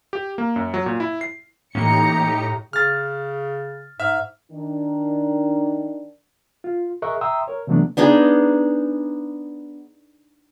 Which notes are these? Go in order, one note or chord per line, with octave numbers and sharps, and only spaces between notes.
G4
A#3
F#2
F#3
A#2
E4
C7
A2 E3 A#3 C#4 D#4 G4 A#5 C#7
C#3 F6 A6
G#2 E5 F6
D#3 D4
F4
G#4 A#4 D#5 E5 C#6 F#6
E5 G5 A#5 C6 D#6 E6
A#4 C#5
C3 E3 F#3 A3 B3 D4
B3 D4 D#4 G#4